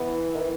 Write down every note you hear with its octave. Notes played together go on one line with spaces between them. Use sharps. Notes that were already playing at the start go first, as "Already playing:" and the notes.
Already playing: E3 B3
D#3
E3